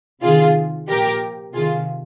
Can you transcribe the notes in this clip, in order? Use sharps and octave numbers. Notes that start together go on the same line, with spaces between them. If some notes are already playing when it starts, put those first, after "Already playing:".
C3 D#3 F4 G#4
A#2 F3 G4 A#4
C3 D#3 F4 G#4